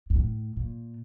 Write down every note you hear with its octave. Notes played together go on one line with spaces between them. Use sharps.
G2
A2
A#2